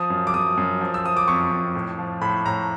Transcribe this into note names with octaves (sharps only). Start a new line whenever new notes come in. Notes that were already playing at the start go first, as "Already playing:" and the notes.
Already playing: F3 D#6
F#2
D6
F#2 D#6
F#2
F3
E6
F3 D#6
D6
F2 C#6
F2
A2
F3
A2 B5
A2 A#5